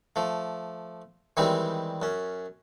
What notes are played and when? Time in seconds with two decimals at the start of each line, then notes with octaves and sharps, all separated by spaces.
0.16 F3 A3
1.37 D#3 E3 G3 G#3 C4 D#4
2.02 F#2 C#4